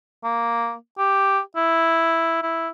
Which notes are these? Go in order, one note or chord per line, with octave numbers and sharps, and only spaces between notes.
A#3
G4
E4
E4